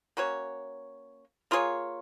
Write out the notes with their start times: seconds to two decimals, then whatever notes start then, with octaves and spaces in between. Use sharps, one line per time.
0.17 A#3 C#4 F#4 C#5
1.51 A#3 F4 G#4 C#5